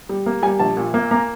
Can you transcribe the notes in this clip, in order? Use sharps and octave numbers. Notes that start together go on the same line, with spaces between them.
G3
A#3
G3 G#5
A#1 A5
A#2
A#3
A#3 A#5